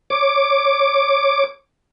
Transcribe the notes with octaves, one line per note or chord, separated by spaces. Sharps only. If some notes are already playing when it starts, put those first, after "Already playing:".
C#5 D6